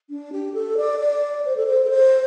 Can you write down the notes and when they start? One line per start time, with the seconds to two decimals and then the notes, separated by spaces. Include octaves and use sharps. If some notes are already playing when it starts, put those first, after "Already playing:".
0.10 D4
0.33 G4
0.54 A4
0.77 D5
0.99 D5
1.46 C5
1.57 A4
1.66 C5
1.84 A4
1.90 C5